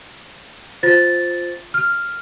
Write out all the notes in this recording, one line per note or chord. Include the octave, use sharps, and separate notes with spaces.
F4 C5 A6
F6